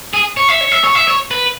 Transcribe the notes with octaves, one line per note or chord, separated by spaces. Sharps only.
G#4
C#5
E5
C#5
E5
C#5
E5
C#5
B4